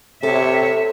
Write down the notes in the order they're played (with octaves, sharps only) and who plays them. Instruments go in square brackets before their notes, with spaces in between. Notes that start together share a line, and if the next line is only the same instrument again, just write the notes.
[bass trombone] C3 [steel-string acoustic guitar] A4 [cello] C#5 E5